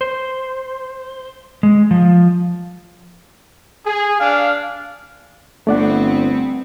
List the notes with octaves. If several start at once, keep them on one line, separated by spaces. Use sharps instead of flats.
C5
G#3
F3
G#4
D4 F5
G1 A3 B3 C4 D5 F#5